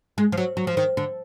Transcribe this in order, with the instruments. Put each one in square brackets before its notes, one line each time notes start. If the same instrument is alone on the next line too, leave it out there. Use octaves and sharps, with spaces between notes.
[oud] G#3
F3
F#3
F#3
F3
D#3
D3